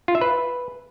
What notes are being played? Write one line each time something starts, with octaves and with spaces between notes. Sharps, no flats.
F4
E5
B4